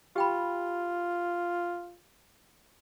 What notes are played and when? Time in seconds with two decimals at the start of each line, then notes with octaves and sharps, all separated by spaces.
0.16 F4 G4 G5 B5